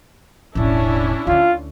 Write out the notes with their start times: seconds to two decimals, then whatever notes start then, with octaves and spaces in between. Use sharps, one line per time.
0.55 E1 A1 C#4 D4 E4
1.27 D2 D3 F4